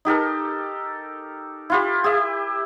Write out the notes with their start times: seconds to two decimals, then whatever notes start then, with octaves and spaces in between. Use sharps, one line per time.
0.05 D#4 G4 A4 A#4
1.70 E4 F4 G4
2.04 G4 E5